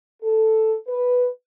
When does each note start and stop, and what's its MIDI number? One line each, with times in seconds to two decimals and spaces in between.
0.22 0.74 69
0.88 1.27 71